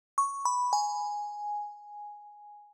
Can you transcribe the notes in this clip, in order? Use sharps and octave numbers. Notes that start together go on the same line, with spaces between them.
C#6
B5
G#5